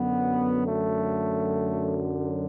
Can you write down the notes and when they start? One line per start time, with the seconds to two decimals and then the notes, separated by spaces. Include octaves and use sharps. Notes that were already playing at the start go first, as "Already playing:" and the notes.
Already playing: F#2 D3 F#3 B3
0.66 A3